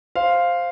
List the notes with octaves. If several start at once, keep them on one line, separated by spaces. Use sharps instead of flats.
C5 F5